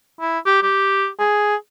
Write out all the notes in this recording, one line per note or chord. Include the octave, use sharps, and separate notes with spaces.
E4
G4
G4
G#4